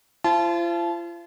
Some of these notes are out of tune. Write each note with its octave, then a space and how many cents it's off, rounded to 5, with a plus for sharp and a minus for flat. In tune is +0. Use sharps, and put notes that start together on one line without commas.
F4 -40 C5 +0 A5 -25